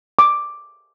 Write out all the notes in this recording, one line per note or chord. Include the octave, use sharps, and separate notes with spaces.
D6